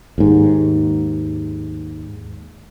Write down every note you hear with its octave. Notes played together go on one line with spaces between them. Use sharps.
D#2 G#2